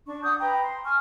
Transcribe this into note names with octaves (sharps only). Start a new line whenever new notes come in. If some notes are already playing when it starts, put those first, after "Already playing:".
D4 C#6
F#5 D6 D#6 G6
B4 G5 A#5
C6
G#5 C#6 F6